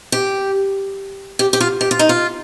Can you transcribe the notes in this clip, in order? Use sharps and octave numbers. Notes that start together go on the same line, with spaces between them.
G4
G4
G4
F4
G4
F4
D#4
F4